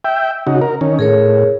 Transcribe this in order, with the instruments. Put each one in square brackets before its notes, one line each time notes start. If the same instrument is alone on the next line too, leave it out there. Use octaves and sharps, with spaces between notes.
[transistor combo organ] E5 G5
C#3 D#4 F#4
A#4
D#3 C#4
[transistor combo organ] A2 [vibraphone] G#4 A#4 C#5